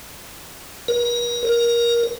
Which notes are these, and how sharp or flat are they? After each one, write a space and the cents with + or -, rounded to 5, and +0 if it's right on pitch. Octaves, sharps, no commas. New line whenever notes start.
A#4 +40
A#4 +15